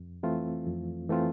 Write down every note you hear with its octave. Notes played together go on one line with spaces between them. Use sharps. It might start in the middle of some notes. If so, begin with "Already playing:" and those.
Already playing: F2
E3 A3 C4 F4
F2
E3 A3 C4 F4